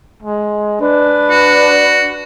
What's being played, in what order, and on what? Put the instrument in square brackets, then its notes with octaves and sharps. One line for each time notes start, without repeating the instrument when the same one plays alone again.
[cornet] G#3
[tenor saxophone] D4 [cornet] B4
[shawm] F#4